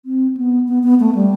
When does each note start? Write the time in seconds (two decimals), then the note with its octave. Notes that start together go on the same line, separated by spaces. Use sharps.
0.05 C4
0.37 B3
0.68 B3
0.83 B3
1.00 A3
1.15 G3